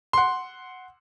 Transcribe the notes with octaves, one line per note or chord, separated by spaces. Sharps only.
F#5 C6